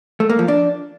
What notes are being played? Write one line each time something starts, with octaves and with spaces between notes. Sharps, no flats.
A3
A#3
F3
D4